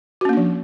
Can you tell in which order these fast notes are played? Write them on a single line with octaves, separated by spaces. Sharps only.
F#4 C#4 A#3 D4 F3